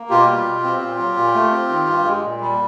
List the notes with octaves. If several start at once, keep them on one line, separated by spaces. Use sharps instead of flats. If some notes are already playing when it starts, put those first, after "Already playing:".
Already playing: A#3
B2 F4 G4
G3
B2
C4
A#2
F#3
A#2
A3
C4
D#3
G2
G#3
A#2
G3